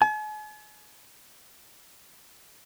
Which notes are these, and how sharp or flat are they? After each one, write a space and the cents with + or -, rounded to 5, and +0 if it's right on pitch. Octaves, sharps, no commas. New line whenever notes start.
G#5 +45